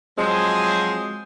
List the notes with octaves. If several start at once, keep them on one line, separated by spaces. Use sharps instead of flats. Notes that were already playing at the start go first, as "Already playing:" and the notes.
F3 F#3 G#3 C4 G#4 C5